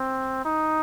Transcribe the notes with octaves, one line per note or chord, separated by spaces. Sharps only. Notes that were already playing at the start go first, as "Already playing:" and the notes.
Already playing: C4
D#4